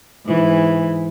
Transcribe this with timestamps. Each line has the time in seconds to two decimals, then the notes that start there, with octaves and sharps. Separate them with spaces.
0.25 G#2 E3